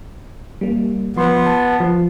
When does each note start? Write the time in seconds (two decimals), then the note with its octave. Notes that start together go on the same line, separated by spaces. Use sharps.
0.61 G3 A#3
1.17 F3 B3 C6
1.46 A5
1.80 F3